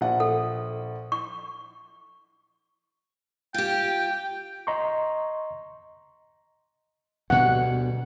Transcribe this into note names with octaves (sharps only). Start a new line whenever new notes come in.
A#1 F#5
A4
C#6
F4 G4 G5
D#5 A#5 C6 C#6
D2 B2 G3 F#5